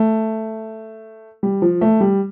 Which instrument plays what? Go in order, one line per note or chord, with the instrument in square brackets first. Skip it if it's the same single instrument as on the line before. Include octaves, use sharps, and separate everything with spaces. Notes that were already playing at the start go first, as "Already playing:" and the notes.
Already playing: [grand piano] A3
G3
F3
A3
G3